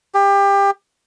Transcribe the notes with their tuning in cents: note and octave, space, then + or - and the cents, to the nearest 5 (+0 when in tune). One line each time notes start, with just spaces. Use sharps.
G4 +25